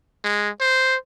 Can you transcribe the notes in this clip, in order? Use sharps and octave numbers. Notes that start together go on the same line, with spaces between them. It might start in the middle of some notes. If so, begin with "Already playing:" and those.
G#3
C5